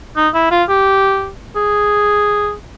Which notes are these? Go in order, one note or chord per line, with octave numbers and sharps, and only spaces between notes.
D#4
E4
F4
G4
G#4